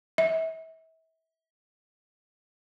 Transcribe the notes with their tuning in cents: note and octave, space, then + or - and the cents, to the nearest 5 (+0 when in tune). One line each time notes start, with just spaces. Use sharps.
E5 -35